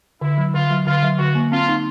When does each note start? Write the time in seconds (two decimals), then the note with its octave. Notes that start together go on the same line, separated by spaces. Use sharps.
0.21 D3 E4
0.38 F#3
0.54 D3 F4
0.70 F#3
0.87 D3 F4
1.03 F#3
1.19 D3 F#4
1.35 A#3
1.52 C4 F4
1.69 D#4